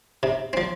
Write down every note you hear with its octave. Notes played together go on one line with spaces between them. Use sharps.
C3
F3 C4